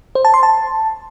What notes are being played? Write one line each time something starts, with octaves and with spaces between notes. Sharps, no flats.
C5
A5
C6
A5